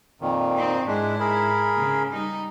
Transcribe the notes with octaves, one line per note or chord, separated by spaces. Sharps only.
F2 A#2 D#3
C4 D#4
G#2 G#3 D4 E4
G#4 A#4 B5
C#3
G3 D#4